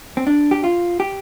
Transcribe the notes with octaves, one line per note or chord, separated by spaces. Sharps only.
C4
D4
G4
F4
G4